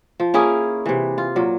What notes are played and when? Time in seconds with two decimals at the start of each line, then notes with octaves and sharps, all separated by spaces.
0.20 F3
0.34 A#3 C#4 E4 G#4
0.86 C3 E3
1.18 F4
1.36 A#2 F#3